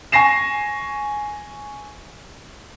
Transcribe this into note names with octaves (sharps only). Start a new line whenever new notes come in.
G#5 C#6 A#6 C7 E7